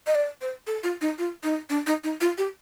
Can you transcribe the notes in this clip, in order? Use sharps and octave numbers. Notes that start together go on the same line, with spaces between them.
D#5
D5
C5
A4
F4
D#4
F4
D#4
D4
D#4
D#4
F4
G4